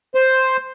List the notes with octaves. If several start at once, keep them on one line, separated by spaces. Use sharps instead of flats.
C5